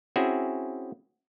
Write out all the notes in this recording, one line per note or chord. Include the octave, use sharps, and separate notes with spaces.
C4 C#4 E4 F#4 G#4 E5